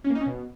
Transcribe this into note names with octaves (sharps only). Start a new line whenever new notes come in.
C#4
A#3
D#4
C#4
B2